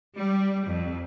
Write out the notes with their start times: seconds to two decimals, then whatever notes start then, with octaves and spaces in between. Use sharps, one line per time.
0.16 G3
0.67 F2